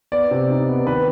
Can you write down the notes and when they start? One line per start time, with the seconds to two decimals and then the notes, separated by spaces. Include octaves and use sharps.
0.12 B3 D5
0.31 C3
0.50 D#4
0.69 B3
0.86 D#3 B4